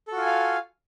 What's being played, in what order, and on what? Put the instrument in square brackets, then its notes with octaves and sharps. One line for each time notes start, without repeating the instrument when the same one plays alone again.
[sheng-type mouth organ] A4
F#4
F4
G#5
F5